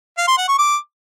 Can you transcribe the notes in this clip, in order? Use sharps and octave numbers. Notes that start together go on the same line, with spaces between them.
F5
C6
F#5
C#6
D6